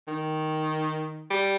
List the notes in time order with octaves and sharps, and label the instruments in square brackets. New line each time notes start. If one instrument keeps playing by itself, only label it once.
[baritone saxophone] D#3
G3